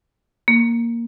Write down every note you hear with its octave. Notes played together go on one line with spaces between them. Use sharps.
A#3